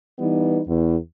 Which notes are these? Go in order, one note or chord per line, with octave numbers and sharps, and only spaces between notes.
E3 G3 B3 D#4
E2